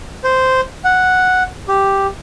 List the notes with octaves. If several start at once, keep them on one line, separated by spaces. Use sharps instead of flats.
C5
F#5
G4